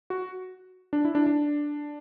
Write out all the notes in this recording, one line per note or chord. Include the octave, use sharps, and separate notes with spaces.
F#4
D4
E4
D4
D4